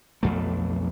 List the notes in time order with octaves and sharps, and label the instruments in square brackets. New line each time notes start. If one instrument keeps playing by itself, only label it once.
[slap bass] B1 F2 A3